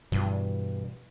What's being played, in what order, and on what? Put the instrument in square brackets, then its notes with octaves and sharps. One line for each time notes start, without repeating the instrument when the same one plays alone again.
[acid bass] G2 [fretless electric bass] B2 E3 G3